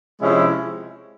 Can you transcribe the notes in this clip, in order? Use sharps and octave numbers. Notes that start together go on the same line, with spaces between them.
C3 F3 G#3 C#4 E4